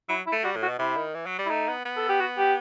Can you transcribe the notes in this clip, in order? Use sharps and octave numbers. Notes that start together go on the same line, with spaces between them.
F#3 E4
E4
A3
G3 F#4
A2
F#4
B2
C3 E4
D#3
E3
F#3
G3
E4
A3 D#4
B3
B3
A4
G4
F#4
G4